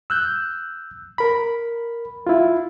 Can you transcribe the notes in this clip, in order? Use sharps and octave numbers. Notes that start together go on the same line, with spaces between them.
E6 F#6 G6
A#4 B5
E4 F4